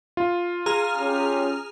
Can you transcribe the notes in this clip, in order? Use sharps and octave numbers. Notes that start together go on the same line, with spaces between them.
F4
G#4 A#5 F6
C#4 G4